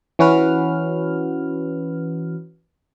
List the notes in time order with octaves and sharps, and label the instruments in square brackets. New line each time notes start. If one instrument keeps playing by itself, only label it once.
[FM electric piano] E3 C#4 F#4 B4 F6